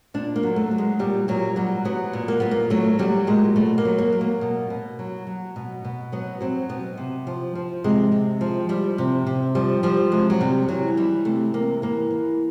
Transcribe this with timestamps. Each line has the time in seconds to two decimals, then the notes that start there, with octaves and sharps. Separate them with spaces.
0.14 A#2 D4
0.36 A#3
0.43 F#3
0.56 A3
0.71 F#3
0.78 G#3
0.99 A#2 G3
1.28 A#2 F#3
1.56 F#3 G3
1.85 F#3 B3
2.13 A#2
2.28 A#3
2.40 A#2 B3
2.51 A#3
2.70 F#3 A3
2.99 F#3 G3
3.27 A#2 G#3
3.56 B2 A3
3.78 A#3
3.85 F#3
3.98 A#3
4.13 F#3
4.21 A#3
4.41 B2
4.70 B2
4.99 F#3
5.27 F#3
5.56 B2
5.85 B2
6.12 F#3 B3
6.41 F#3 C4
6.69 B2 B3
6.98 C3
7.27 F3
7.55 F3
7.84 C3 G#3
8.12 C3
8.41 F3
8.69 F3 G3
8.98 C3
9.27 C3
9.55 F3 G3
9.83 F3 G3
10.12 C3 G#3
10.30 F#3
10.40 C3 G3
10.68 E3 F#3
10.97 E3 G3
11.25 C3 A3
11.54 C3 A#3
11.82 E3 A#3
12.11 E3